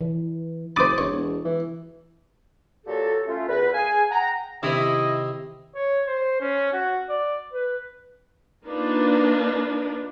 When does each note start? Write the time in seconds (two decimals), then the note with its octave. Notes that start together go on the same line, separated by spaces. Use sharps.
0.01 E3
0.76 F#1 C5 B5 D6 D#6 A6
0.98 E1 C#5
1.13 E1
1.45 E3
2.86 A#2 F#3 F#4 G4 A4
3.27 A3 C#4 F4
3.48 E2 A#4 B4
3.74 G#4 F5 G#5
4.10 F#5 G5 A#5
4.63 C3 D#3 E4 D#5
5.75 C#5
6.07 C5
6.41 C#4
6.73 F#4
7.09 D5
7.53 B4
8.65 A#3 D4 D#4 F4 B4